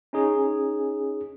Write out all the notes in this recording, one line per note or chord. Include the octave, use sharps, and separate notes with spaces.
C#4 D#4 G#4